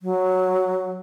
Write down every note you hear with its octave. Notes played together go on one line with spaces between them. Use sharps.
F#3